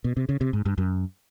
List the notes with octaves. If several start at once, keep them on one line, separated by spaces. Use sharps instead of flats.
B2
C3
C#3
C3
G#2
G2
F#2